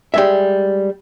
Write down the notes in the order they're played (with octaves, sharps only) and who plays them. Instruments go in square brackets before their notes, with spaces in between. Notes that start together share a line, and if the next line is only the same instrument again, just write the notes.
[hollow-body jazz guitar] G3 G#3 E5